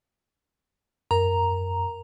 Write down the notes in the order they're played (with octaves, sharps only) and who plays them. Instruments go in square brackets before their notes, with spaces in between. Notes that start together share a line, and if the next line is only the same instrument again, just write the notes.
[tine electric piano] F#2 [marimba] A#4 [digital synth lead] A#5